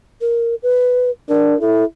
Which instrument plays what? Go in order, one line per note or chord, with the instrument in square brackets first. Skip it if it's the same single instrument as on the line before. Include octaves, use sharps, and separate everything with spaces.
[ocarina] A#4
B4
[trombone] D4 [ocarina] A#4
[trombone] E4 [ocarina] A4